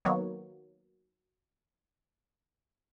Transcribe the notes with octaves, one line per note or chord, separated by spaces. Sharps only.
D#3 F#3 A#3 B3 C#5